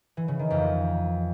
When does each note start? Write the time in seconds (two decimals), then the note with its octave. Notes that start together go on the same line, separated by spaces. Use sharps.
0.17 E3
0.28 C#3
0.39 D#3
0.50 F2